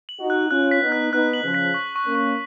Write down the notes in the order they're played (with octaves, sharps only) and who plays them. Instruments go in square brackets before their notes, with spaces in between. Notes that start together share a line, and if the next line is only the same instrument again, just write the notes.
[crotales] F#7
[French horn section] D#4 F#4
[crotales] F#6
[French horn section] C#4 F4 [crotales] F#6
[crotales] B6
[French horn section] B3 D#4
[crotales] F#6
[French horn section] B3 D#4 [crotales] F#6
[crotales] F#7
[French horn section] C#3 F3
[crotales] B6
C#6
C#6
[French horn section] A#3 C#4
[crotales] C#6